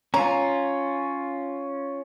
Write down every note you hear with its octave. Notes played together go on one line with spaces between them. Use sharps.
C#4 F4 A#5